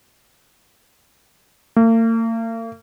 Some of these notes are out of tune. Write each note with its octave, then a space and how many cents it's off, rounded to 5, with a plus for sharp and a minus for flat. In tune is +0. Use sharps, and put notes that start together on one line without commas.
A#3 -45